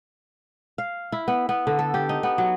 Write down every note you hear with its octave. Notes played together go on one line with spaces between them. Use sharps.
F5
E4
B3
B3
D3
A4
G4
D#4
B3
F#3